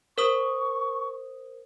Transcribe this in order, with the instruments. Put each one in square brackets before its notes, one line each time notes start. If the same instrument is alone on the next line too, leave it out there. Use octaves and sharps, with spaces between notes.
[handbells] A#4 C5 D#6 [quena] C#6